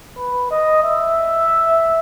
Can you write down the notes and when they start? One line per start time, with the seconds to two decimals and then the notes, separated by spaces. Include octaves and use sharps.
0.18 B4
0.51 D#5
0.83 E5